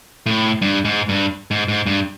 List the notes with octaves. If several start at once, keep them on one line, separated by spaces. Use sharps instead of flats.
A2
G2
G#2
G2
G#2
G#2
G2